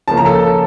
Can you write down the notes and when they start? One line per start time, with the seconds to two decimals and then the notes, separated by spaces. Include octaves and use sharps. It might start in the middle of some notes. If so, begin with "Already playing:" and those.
0.08 C#3 F3 A#3 C#4 A5
0.17 A#5
0.26 A4 A5